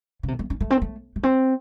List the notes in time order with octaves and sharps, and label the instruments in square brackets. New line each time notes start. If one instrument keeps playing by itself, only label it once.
[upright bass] C#3
C3
A3
C#4
A3
C4
A3
A3
C4